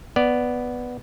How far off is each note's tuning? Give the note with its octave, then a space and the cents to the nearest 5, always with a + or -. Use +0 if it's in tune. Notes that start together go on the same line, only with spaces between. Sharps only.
B3 +0 D5 +0